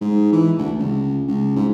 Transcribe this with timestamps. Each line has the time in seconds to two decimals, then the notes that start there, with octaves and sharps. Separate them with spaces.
0.01 G#2
0.32 E3
0.58 D2
0.79 C#2
1.28 C#2
1.56 G#2